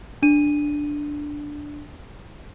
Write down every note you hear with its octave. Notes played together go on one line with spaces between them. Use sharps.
D4 D#7